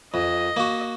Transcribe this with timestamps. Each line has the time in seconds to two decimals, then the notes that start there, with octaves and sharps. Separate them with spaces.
0.14 F2 D#5
0.57 A#3 F#4